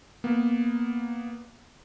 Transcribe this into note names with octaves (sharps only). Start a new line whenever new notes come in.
A#3 B3